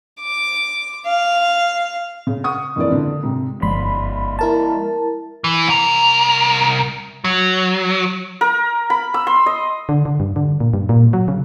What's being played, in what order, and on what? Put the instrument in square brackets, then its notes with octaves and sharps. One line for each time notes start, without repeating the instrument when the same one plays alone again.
[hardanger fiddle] D6
F5
[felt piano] C#3
F#5 C#6 D#6
F#1 F2 E3 D5
D3
G#2 C3
[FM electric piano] G1 B5 C6 [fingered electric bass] F3 G#3
[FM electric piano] E4 A#4 A5
[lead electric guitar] E3
C2 A#4
F#3
[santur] A#4
B5
E6
C6
D#5
[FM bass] D3
D3
G2
D3
A#2
G2
A#2
F#3
C#3